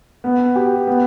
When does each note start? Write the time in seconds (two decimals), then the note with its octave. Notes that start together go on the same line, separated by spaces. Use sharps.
0.24 B3
0.56 G4
0.87 B3